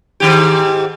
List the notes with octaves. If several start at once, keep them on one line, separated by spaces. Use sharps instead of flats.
G#2 D#3 G4